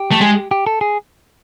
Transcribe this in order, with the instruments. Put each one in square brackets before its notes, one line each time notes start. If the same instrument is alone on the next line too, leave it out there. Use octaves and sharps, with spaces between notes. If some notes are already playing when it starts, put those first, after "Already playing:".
Already playing: [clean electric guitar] G4
[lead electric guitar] A3
G#3
[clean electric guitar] G4
A4
G#4